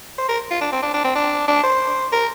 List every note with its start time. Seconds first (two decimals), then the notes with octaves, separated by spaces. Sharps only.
0.18 C5
0.28 A#4
0.51 F4
0.61 D4
0.72 C4
0.82 D4
0.94 D4
1.04 C4
1.15 D4
1.48 D4
1.63 C5
2.12 A#4